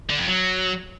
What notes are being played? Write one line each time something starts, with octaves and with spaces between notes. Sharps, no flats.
D3
F2
F#3